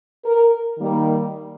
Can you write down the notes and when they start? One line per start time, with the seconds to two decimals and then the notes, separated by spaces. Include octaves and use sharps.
0.25 A#4
0.78 D#3 G3 A#3